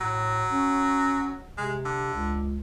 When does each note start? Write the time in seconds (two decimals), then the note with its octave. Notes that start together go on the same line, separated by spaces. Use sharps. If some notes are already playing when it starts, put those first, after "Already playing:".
0.01 A2 F#3
0.51 C#4
1.58 C3 G#3
1.85 D3
2.14 C#2